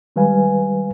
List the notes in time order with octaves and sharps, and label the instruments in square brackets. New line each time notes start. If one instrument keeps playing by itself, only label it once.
[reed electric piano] D#3 G3 G#3 B4 F5 G#5